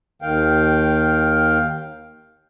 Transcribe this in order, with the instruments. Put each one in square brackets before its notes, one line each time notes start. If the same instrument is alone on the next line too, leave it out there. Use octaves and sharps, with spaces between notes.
[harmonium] D#2 D#3 F5 G5